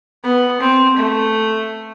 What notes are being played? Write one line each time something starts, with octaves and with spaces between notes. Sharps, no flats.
B3
C4
A3